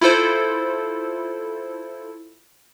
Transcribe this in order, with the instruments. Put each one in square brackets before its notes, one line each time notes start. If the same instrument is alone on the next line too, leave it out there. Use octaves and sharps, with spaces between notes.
[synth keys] E4 F4 A4 C5